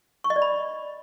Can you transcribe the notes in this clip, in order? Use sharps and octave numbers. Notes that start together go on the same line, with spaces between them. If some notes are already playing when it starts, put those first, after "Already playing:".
C#6
D#5
D5
B5